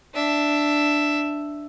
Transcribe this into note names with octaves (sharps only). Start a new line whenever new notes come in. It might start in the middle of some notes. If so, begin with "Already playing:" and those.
D4 E5